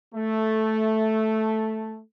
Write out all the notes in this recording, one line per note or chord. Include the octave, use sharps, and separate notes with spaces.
A3